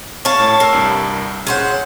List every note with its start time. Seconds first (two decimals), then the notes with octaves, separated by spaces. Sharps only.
0.25 C#5 F5 A5
0.40 A2
0.60 A#4 E6 F6 C7
0.73 C2 G2 B5
1.47 C#3 C#4 C5 F#5 G6